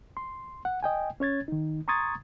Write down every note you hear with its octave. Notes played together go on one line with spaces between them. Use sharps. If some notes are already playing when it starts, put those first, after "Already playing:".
C6
F#5
D#5 G5 G#5
C#4 C#5 G#6 A6
D#3 D#4
A#5 C6 C#6 D#6 G#6 A6